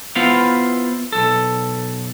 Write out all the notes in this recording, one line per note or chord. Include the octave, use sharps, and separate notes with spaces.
B3 E4 F4 C5 F5
B1 A4